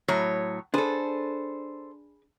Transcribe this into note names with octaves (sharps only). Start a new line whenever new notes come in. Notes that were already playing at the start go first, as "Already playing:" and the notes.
A2 F#3 C#5
D4 G#4 A4 B4 C5